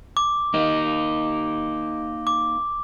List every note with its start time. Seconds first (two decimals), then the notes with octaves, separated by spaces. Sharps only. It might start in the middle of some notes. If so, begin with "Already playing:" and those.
0.17 D6
0.54 A#3 D#4
2.27 D6